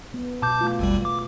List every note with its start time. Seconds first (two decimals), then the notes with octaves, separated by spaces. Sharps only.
0.14 B3
0.42 B2 A5 D6 G6
0.61 A3 F4
0.79 G#1 D#2 G3
1.05 D6